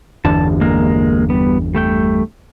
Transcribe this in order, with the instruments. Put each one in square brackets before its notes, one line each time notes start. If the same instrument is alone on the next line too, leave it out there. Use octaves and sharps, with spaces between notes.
[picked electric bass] G1 E2 D3 [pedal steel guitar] A5
[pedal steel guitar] G#3 A#3 A#4
G3 B3
G3 A3 G5